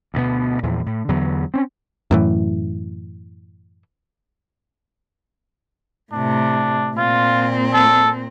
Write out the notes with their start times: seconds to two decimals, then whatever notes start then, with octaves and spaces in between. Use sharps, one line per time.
0.14 D2 B2 B3
0.63 E2 A#2 E3 F3
0.86 A2
1.08 E2 D3 F#3 B3
1.54 C4 C#4
2.11 F#2 A2 E3
6.12 A2 C3 D4
6.97 A#2 C4 F4
7.74 A4